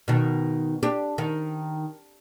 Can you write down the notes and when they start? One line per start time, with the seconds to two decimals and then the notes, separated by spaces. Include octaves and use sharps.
0.08 B2 D#3
0.83 D4 G4
1.18 D#3